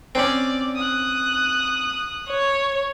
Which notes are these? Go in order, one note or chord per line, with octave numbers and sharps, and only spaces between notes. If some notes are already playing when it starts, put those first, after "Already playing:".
C4 C#4 D5
D#6 F#6
C#5